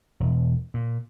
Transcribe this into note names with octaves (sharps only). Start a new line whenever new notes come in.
E1
A#2